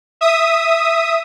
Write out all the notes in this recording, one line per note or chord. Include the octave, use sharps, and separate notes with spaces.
E5 D#6